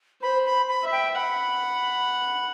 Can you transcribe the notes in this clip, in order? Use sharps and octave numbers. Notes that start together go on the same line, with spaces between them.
C5 B5
B5
B5
E5
G5
F#5 B5